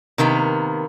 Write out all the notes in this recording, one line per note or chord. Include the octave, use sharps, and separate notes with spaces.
C3 D#3 A#3 B3